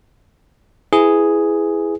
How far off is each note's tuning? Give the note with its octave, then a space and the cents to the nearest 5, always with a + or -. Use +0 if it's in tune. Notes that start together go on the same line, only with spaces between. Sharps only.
E4 +0 G#4 +0 B4 +30